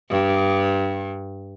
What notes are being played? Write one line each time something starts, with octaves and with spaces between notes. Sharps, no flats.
G2